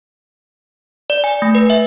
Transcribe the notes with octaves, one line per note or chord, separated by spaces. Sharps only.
D5
G#5
A3
B4
E5